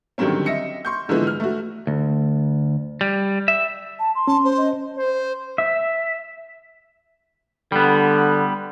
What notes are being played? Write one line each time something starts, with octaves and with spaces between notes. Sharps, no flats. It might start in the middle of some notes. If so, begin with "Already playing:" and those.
D3 D#3 F#3 G3 C4 C#4
D#5 E5 A#6 C#7
C6 C#6 G6
G#2 D3 E3 F3 G#3 B3
F6
A3 F#4
D2
G3
E5
A5
C6
C#4 A5
C5
D#5
C5
E5
D3 G3 B3